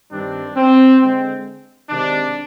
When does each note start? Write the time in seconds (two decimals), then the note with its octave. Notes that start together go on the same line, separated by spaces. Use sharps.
0.11 G2 D#3 G3 C4 D4
0.55 C4
1.00 D3 G#3 C4
1.90 C3 D#3 G#3 D4